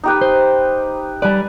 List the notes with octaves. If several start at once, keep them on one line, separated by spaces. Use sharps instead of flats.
D#4 G4 B4
C5
G3 B4 D5 G#5 A5